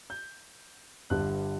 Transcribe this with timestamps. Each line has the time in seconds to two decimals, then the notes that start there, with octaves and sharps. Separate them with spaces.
0.10 G6
1.10 G1 G2 D3 G3 F#6